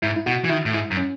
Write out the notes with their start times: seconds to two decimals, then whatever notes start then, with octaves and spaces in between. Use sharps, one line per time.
0.02 G#2 E4
0.16 E4
0.26 B2 F#4
0.44 E3
0.49 D#3 E4
0.66 A2
0.73 G#2 E4
0.91 F#2
0.97 C#4